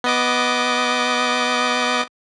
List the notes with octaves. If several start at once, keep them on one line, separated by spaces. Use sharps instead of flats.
B3 D#5 D6